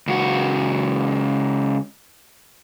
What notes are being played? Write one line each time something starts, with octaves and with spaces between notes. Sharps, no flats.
C#2 F#4